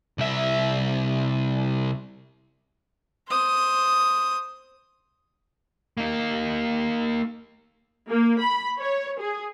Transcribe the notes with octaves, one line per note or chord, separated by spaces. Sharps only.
C2 E5
C5 D#6
A#3 D#4
A#3
B5
C#5
G#4